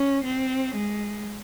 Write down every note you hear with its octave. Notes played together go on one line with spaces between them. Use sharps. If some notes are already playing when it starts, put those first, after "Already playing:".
Already playing: C#4
C4
G#3